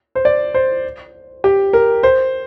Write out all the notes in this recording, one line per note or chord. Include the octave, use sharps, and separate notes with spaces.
C5
D5
C5
G4
A#4
C5